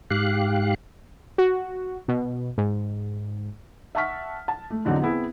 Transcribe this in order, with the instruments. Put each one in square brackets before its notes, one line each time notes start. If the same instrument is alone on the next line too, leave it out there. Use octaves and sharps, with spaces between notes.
[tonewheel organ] G#2 G4 F5 F#6
[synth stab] F#4
B2
G#2
[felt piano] E5 F#5 A5 C#6 F6 B6
A5
A3
E2 D3 F#3 C4 D#4
B3 C4 E4 G#4